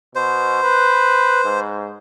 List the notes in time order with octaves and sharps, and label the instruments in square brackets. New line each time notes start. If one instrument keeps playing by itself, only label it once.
[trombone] B2 [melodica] C5
[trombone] B4
G#2